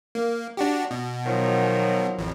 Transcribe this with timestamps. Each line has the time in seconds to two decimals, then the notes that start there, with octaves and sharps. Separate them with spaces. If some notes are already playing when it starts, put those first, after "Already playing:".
0.15 A#3
0.57 D4 F#4 G4
0.91 B2
1.26 D#3 F3 F#3
2.18 A1 F2